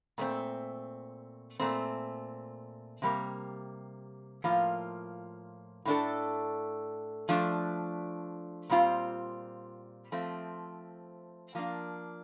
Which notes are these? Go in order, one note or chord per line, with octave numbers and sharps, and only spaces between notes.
A#2 A3 C4
A#2 A3 C4
C3 G3 A#3
A2 F3 A#3 F4
A2 A3 D4 A4
F3 A3 D4
A#2 G3 C4 F4
F3 A3 C4
F3 A#3 D4